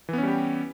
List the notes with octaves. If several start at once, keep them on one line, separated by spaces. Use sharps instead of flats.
E3 G3 B3 C#4 G4